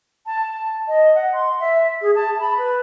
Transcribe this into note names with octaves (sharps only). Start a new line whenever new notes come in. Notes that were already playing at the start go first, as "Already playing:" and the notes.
A5
D#5
F#5
C6
E5
G#4
A5
B5
B4